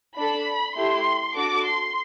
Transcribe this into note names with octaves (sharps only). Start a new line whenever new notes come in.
D4 A4 B5
A3 E4 G4 C6
D4 F#4 A4 D6
C6